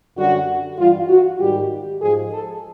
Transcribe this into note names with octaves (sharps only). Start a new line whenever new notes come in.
F#2 D3 G3 F#4
G2 E3 G3 F4
F#4
G#2 D#3 G3 G4
G#2 F3 G#3 G#4
A4